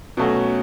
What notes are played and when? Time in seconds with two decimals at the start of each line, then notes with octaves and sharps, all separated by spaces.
0.17 B2 F#3 A3 C#4 F#4